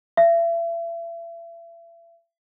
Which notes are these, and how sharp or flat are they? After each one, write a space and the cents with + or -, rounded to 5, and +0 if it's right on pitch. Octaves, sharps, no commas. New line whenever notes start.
E5 +35